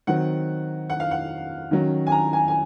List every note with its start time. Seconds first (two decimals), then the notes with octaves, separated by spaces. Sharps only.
0.07 D#3 F#3 C4 F#5
0.90 F#5
1.00 F5
1.11 F#5
1.71 D#3 F#3 C#4
2.07 G#5
2.12 A#5
2.33 G#5
2.48 G#5